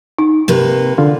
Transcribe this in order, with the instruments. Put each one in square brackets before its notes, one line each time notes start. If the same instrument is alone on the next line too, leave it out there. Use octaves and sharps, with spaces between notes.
[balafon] D#4
[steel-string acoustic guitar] C3 A#3 B4
[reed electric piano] D3 F4